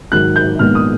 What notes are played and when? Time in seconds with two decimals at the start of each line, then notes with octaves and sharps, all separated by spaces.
0.11 G#2 D#3 F#3 F#6
0.36 G6
0.59 A#1 G#2 D#3 G#3 B3 F6
0.75 D#6